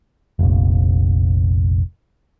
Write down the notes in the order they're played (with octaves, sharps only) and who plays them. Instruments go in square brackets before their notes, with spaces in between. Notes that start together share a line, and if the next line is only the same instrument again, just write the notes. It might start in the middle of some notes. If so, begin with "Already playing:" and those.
[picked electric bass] F1 A#1